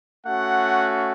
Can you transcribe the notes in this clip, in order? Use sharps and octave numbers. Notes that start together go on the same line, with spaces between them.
A3 C#4 F#4 F#5